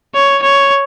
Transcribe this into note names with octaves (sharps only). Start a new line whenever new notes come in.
C#5
C#5